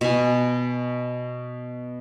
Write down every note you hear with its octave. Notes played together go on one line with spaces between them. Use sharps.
B2 G#5